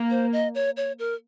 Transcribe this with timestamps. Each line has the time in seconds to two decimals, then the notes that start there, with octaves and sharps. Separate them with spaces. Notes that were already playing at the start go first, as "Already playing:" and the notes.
Already playing: A#3
0.10 C5
0.33 D#5
0.55 C#5
0.77 C#5
0.99 A#4